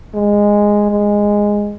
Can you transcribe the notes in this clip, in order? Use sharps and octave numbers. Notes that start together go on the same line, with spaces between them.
G#3
G#3